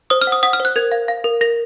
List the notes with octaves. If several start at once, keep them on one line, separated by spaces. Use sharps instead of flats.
C5 D#6
F6
F#5
D#6
F#5 D#6
F6
C5
F#6
A#4 G#6
F5
F5
A#4
A#4 A#6